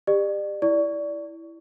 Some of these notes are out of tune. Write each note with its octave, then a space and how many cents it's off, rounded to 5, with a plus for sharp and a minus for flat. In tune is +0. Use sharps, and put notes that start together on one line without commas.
G4 +25 D5 +35
E4 +0 D5 -10 C#6 +20